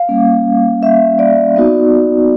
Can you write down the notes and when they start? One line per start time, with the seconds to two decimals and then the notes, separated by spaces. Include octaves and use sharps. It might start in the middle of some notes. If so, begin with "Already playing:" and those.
Already playing: F5
0.09 G3 A#3 C#4
0.83 E5
1.19 D5
1.56 B3 D#4 F#4